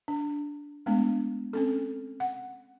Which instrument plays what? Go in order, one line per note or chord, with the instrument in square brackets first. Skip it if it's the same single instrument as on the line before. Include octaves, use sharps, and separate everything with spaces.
[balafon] D4
G#3 A3 B3 D4
C4 C#4 A4
F#5